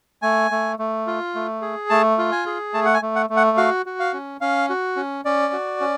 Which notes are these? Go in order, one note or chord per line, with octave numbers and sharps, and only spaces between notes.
A3 G#5
A3
A3
F4
A3
G#4
A3 A5
F4
G#5
G#4
A3 A5
F#5
G#5
A3
F#5
A3
F#5
F#4 F5
F#4
F5
C#4
C#4 F5
F#4
C#4
C#4 D5
F#4
C#4